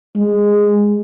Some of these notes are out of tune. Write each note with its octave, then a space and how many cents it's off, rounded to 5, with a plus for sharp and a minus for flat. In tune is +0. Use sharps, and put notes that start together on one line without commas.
G#3 -10